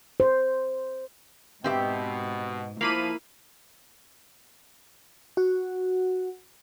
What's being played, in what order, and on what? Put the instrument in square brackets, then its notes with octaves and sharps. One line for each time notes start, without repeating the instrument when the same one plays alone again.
[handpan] C5
[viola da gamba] G#2 [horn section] B2 [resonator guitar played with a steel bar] C4 G4 E5
[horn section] F3 [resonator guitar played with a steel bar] A#3 [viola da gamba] E4 [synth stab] F5 B5 D#7
[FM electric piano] F#4 F#5